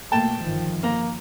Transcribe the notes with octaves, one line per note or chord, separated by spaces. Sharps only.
B2 A3 A#3 G5 A5
G1 D#3 F3
A#3 A#5